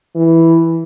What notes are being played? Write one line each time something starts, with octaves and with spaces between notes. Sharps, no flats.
E3